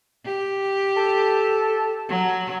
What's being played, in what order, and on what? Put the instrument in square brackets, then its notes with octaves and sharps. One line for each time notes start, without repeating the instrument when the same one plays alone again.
[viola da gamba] G4
[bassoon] A4
[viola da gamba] F#3